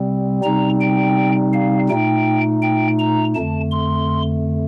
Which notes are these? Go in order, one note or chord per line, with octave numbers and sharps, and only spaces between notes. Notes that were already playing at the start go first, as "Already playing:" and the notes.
Already playing: C3 G3 C4
C3 G3 C4 D#4 A#5
G5
F5
A#2 A3 D#4 G5
G5
A#5
F2 D3 A3 A5
C6